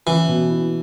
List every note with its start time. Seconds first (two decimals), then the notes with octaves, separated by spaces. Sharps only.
0.06 E3 C#4
0.28 B2
0.49 E4